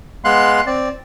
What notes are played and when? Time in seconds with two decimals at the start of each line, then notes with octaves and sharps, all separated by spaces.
0.25 G#3 B3 F5 C6 F#6
0.66 C4 D5